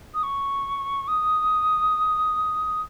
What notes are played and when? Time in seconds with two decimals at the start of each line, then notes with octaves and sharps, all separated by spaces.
0.14 D#6
0.23 C#6
1.08 D#6